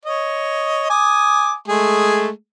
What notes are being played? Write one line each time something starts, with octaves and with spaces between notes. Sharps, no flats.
C#5 D#5
G#5 D6 D#6
G#3 A3 G#4